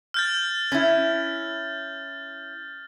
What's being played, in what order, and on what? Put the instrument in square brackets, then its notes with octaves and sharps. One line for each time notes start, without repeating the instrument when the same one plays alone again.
[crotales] F6 G6 A6
[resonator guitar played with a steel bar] C#4 E4